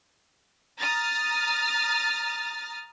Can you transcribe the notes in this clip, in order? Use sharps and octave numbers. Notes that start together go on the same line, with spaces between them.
A#5 D#6 F6 A6